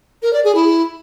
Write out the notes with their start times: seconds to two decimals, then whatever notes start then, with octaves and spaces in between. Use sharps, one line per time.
0.22 A#4
0.33 D5
0.44 G#4
0.55 E4